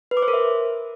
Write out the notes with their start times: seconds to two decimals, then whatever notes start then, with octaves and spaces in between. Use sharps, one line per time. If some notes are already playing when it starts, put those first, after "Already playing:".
0.11 B4
0.17 D6
0.22 C5
0.28 A#4
0.34 E5